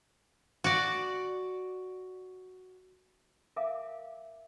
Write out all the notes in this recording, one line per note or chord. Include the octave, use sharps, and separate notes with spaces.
F#4 D5
A#4 E5 F5 G#5 D6